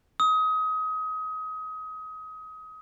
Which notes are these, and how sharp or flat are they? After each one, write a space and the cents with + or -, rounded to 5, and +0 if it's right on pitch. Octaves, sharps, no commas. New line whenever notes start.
D#6 +25